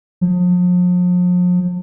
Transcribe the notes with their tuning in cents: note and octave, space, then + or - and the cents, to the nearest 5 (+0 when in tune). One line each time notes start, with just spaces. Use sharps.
F3 +40